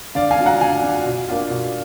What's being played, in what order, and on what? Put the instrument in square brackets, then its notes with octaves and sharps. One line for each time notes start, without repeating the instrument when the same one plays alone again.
[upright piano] D3 D5 F5
F5 G#5
F#3 D4 F4
F#5 A#5
D3 F5 G#5
F#3 D4 F4
B2
A#3 D4 F4
B2